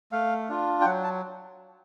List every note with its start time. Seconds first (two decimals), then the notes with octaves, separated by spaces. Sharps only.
0.12 A3 F5
0.49 D4 F4
0.81 G5
0.85 F#3 F#5
1.04 A5